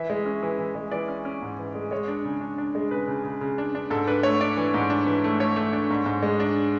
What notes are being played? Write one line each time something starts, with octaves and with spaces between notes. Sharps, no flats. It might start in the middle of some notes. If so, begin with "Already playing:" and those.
Already playing: E3 E5
G#3
C#4
E3
E3
G#3
E3 D5
C#4
C#4
G#2
E3
G#3
G#3 C#5
D4
C#3
D4
D4
G#3
C#3 B4
C#3
C#3
C#3
D4
D4
G#2 A4
D4 B4
A3 C#5
D4 D5
E3
G#2
D4
E3
A3
A3 C#5
A3
D4
G#2
G#2
G#3
D4